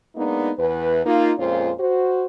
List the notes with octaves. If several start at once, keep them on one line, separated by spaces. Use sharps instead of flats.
G#3 A#3 B3 D4 D#4
E2 B4
A#3 D#4 F4
F2 A#2 G#3 C#4 F4 C5
F#4 C5